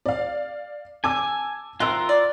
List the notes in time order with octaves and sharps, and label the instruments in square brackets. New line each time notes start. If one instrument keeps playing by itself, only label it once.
[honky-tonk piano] D5 F5
[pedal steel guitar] G#5 [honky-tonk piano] A5 D6 E6
[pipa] D#3 A3 C4 [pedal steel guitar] F4 A#4 [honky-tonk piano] E6 F#6
[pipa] D5